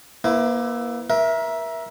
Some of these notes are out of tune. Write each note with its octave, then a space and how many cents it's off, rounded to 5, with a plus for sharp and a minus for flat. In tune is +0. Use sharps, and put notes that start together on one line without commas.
A#3 +25 E4 +0 B4 +45
A#4 +30 E5 +0